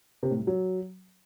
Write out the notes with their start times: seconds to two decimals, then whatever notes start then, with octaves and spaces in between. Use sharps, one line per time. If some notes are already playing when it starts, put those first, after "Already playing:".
0.23 C3
0.31 A2
0.39 G3
0.47 F#3